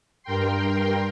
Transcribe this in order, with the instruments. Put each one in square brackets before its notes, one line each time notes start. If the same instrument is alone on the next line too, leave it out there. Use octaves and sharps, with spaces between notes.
[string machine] G2 A#4 G5 C6